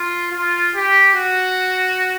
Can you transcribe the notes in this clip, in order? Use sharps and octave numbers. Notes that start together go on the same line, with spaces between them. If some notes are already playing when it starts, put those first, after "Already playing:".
Already playing: F4
F4
G4
F#4